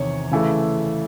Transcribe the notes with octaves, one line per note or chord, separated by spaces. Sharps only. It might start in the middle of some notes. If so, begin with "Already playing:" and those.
Already playing: E2 C3 D#3 C#5
C#3 E3 A3